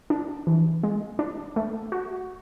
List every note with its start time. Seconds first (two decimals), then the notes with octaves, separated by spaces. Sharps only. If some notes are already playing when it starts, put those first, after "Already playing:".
0.10 D4
0.47 E3
0.83 G#3
1.19 D4
1.56 A3
1.92 F#4